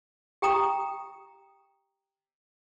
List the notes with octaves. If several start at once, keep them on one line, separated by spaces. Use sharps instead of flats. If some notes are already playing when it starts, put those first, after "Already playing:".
G4 G5 A#5 D#6